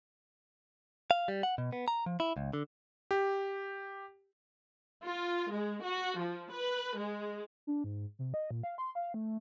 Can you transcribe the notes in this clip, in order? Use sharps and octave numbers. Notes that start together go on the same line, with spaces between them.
F5
G3
F#5
B2
B3
A#5
F3
E4
C#2
D3
G4
F4
G#3
F#4
F3
B4
G#3
D4
G#2
C3
D#5
A#2
F5
C6
F5
A3